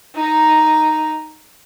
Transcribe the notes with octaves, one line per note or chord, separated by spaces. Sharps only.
D#4 A#5